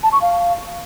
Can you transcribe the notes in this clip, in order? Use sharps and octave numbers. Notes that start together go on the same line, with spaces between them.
A5
C#6
F5